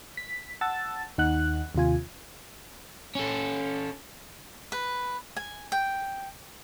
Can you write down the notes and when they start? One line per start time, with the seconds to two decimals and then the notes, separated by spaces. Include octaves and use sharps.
0.17 B6
0.61 F#5 A5 E6 A6
1.18 D#2 D#4 F#5 F#6
1.75 D#2 C3 F4 G#5
3.15 C#4 A4
4.72 B4
5.36 G#5
5.72 G5